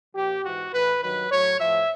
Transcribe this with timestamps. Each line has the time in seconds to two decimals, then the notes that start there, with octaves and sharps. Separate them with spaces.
0.15 A#2 F3 G4
0.43 G#2 E3 F#4
0.72 A2 E3 B4
1.02 G2 D#3 F#3 B4
1.31 A2 F#3 C#5
1.59 A2 F3 E5